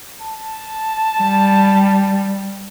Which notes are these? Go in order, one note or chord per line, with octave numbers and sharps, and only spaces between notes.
A5
G3